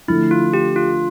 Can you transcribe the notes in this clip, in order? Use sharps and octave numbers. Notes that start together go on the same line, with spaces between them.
D3 F3 A3 E4
F4
G4
F4